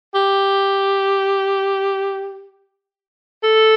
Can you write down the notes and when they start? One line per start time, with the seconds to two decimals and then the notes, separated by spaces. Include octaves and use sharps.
0.15 G4
3.44 A4